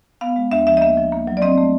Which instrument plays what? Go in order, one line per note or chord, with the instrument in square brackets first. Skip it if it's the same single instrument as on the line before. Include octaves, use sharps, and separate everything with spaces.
[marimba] B3 F5
G#3
D2 E5
F3 E5
D#5
A#3 E5
F3
A#3
F#3
D5
C4 D#5
A3